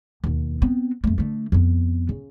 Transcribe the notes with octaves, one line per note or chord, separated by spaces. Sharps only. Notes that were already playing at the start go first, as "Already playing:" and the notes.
D#2 B2
B3 C4
F2 A3
D3 A3
F2 B3
C#3